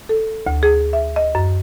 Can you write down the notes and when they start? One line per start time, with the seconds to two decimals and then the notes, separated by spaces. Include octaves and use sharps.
0.09 A4
0.47 D2
0.63 G#4
0.93 E5
1.16 D#5
1.35 F#2